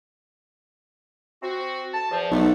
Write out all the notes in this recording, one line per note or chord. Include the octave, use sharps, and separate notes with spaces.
C4 F#4
A5
E2 F3
B1 A3